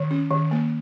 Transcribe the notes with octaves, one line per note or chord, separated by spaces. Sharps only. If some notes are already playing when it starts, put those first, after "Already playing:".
Already playing: D#3
C#4
D#3
A#3